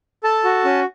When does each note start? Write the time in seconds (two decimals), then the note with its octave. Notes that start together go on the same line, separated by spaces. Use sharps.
0.23 A4 A5
0.44 F#4
0.65 C#4